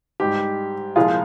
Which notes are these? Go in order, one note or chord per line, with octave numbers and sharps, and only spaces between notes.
G#2 G3 G4
C2 A#2 F3 G#3 F4 G#4